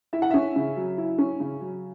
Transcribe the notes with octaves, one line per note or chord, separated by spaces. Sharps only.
E4 E5
F#5
C#4 E5
C#3
F#3
E4
C#4
C#3
F#3